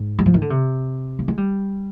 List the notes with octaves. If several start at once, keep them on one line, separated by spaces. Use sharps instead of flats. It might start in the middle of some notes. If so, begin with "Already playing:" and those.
Already playing: G#2
G3
F3
D#3
D3
C3
A#3
G#3
G3